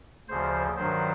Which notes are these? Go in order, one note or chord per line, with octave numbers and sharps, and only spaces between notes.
D2 C#3 F3 C5
G2 D#3 F#3 C5